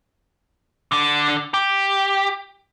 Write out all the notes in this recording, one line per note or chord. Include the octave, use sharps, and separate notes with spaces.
D3 D4
G4